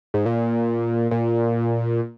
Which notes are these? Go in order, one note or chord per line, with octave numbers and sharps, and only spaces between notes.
G#2
A#2
A#2